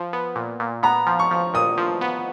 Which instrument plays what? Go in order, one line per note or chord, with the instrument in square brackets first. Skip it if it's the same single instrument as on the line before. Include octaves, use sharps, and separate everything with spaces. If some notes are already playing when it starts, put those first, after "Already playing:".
Already playing: [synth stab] F3
B3
A#2
A#2
[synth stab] B3 [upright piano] A#5
[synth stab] F3
[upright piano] C#6
[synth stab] F3
[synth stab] A#2 [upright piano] D#6
[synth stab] F3
B3